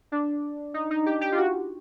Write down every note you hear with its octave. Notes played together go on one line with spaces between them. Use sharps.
D4
D#4
D#4
G4
G4
F4
F#4